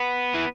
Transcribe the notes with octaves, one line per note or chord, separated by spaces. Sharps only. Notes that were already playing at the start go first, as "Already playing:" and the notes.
Already playing: B3
E3